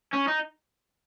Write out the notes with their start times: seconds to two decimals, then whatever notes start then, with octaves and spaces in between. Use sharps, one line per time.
0.13 C#4
0.27 D#4